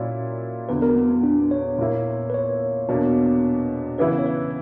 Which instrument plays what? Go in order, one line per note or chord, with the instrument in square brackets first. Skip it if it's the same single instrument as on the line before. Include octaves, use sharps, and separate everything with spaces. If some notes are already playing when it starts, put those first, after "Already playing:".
Already playing: [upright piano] A#2 F#3 C#4 E4 [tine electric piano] D5
[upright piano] E2 D3 F#3 [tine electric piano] B4
[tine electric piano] A#4
B3
B3
D4
C#5
[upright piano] A#2 A#3 E4
[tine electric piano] B4
C#5
[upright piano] E2 B2 A#3 D4
[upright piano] C#3 E3 B3 E4 [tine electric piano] B4
[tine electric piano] C#5
B4